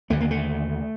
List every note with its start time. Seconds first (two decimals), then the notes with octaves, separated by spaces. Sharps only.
0.10 D#2 D3 A3
0.20 A#3
0.31 A3